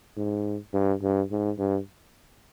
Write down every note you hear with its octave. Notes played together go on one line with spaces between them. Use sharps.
G#2
G2
G2
G#2
G2